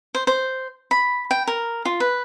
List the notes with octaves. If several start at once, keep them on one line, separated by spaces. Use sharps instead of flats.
C5
C5
B5
G5
A#4
F4
B4